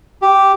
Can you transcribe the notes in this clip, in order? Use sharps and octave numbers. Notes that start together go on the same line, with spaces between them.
G4